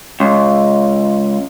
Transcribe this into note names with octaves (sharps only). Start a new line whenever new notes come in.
C#2